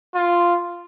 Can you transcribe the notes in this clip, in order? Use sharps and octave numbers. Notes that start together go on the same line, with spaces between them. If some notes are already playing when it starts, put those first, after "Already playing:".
F4